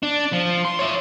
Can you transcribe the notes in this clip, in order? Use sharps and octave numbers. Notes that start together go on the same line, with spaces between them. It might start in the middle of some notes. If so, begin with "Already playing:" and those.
D4
F3
C6
C#5 E5